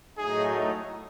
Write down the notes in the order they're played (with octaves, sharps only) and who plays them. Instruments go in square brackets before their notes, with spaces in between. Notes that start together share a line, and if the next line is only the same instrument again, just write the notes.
[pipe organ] A2 F#3 A3 D#4 [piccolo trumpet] G#4